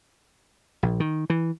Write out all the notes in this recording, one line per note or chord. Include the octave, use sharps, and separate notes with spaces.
A#1
D#3
E3